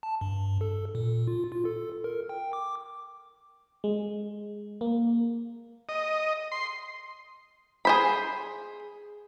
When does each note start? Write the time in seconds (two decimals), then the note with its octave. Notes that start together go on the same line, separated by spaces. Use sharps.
0.03 A5
0.21 G2
0.61 A4
0.95 A#2
1.27 F4
1.52 F4
1.65 A4
2.04 A#4
2.29 G5
2.53 D6
3.84 G#3
4.81 A#3
5.89 D#5
6.52 C6
7.85 G#4 C5 B5